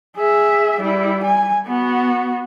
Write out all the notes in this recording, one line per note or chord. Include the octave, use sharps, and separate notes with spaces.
G#4 E5
G3 E4
G#5
B3 F#4